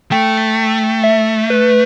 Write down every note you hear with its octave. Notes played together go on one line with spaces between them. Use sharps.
A3 G5
E5
B4